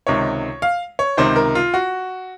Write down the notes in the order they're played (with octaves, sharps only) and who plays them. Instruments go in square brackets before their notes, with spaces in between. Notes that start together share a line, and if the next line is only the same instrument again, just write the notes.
[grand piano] C#2 C3 D#3 C#5
F5
C#5
C#2 C3 D#3 C5
A#4
F4
F#4